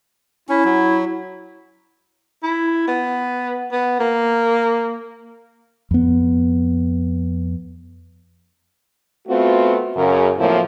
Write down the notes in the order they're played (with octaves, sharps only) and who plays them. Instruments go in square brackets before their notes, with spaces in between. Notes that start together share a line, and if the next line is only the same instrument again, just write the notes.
[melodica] C#4 [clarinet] E4
[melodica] F#3
[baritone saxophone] E4
B3
B3
A#3
[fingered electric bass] F2 B3
[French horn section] A3 B3 C4 F4 F#4
F#2 C#3 A#4
A2 F3 F#3 A#3 C4 E4